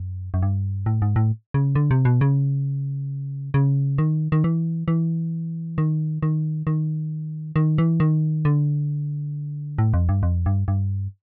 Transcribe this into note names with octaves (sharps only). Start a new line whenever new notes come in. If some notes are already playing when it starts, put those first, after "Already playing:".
Already playing: F#2
F#2
G2
A2
G#2
A2
C#3
D3
C3
B2
C#3
C#3
D#3
D#3
E3
E3
D#3
D#3
D#3
D#3
E3
D#3
D3
A2
F2
G2
F2
G2
G2